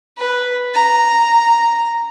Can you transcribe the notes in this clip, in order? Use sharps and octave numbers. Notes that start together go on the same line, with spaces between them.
B4
A#5